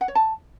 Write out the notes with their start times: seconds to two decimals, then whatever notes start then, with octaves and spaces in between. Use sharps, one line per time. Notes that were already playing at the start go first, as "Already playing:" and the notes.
0.01 F#5
0.08 C#5
0.15 A5